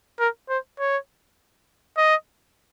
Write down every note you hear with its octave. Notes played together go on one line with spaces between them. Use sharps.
A#4
C5
C#5
D#5